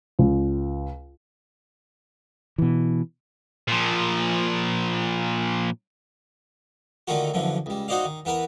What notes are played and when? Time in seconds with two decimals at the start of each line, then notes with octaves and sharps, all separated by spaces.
0.19 C#2
2.58 B2 E3
3.68 A#2 F3
7.08 D3 D#3 A3 A#3 F4 F#4
7.34 F#2 D3 E3 F3
7.66 C#2 G3
7.88 D#4 F#4 C5 D5 D#5 F5
8.05 D#3
8.25 E3 B3 A#4 B4